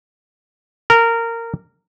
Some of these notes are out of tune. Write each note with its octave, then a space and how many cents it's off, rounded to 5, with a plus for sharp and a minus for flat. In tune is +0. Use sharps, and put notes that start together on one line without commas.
A#4 -15